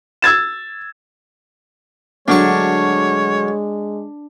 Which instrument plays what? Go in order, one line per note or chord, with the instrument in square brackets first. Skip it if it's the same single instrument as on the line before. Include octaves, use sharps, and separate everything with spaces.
[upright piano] E6 G#6 A6 E7
[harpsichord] D2 F#3 C#6 [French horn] G#3 [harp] D4 [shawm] C#5